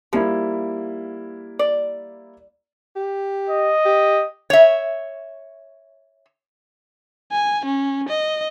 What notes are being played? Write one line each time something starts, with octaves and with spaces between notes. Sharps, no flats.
F3 G3 A#3 E4
D5
G4
D#5
G4
C#5 E5
G#5
C#4
D#5